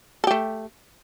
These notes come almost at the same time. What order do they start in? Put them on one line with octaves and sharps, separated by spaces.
A4 G4 A3